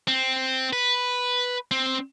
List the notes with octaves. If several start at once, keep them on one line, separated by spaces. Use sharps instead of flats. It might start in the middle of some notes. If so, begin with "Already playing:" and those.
C4
B4
C4